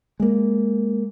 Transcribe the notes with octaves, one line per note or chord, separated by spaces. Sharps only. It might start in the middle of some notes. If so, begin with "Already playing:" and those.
G#3 A#3